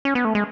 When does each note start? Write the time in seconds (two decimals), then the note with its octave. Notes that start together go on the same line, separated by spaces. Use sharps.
0.05 C#4
0.15 B3
0.25 A3
0.35 G#3